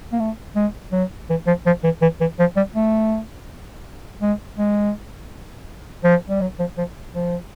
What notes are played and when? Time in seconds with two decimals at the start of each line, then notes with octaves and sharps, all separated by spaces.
0.12 A#3
0.20 A3
0.56 G#3
0.92 F#3
1.30 E3
1.47 F3
1.66 F3
1.84 E3
2.02 E3
2.21 E3
2.39 F3
2.57 G3
2.75 A3
4.22 G#3
4.58 G#3
6.04 F3
6.29 G3
6.41 F#3
6.59 F3
6.78 F3
7.14 F3